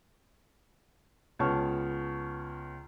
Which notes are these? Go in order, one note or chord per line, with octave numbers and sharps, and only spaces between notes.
C#2 B3 C#5 A5 C#6 F6